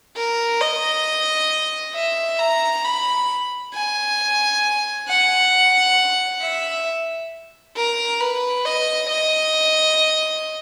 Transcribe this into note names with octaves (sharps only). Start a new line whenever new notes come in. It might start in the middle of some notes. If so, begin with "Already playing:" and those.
A#4
D#5
E5
A#5
B5
G#5
F#5
E5
A#4
B4
D#5
D#5